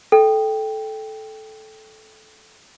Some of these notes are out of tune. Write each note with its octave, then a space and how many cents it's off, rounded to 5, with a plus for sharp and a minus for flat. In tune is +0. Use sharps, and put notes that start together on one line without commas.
A4 -15 G5 +0